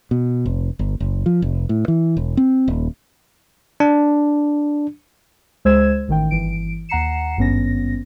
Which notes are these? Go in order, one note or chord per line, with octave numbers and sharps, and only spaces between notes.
B2
F1
G1
F#1
F3
F1
A2
E3
E1
C4
D#1
D4
C#2 G#3 C5 E6 G#6 E7
A1 D#3 G5
G1 E3 D7
D#2 F#5 A#5 C7 C#7 E7
G#1 G2 B3 C#4 A#6